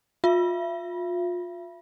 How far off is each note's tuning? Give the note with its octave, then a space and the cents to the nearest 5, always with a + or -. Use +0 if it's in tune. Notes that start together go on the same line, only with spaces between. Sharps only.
F4 +30 E5 +40